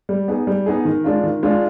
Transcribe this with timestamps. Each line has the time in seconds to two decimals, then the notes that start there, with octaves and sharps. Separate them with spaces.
0.09 G3
0.28 B3 D#4 G#4
0.47 G3
0.66 B3 D#4 G#4
0.85 D#3
1.04 G#3 D4 F4
1.23 D#3
1.43 G#3 D4 F4